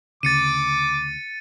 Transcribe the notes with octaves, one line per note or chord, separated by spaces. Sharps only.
D2 C#3 D6 A6 C#7 D#7